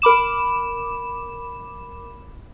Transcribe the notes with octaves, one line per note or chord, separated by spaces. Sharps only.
A#4 B5 D6 E7